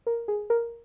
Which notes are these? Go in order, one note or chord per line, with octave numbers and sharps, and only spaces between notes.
A#4
G#4
A#4